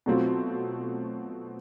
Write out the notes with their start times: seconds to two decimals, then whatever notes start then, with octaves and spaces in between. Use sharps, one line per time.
0.06 B2 F#3 A3 C4 F4